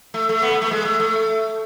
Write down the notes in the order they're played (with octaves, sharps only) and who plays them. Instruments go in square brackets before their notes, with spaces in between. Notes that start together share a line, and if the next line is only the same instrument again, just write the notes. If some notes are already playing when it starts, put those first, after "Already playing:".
[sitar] A3
A3
B3
A3
A3
G#3
A3
A3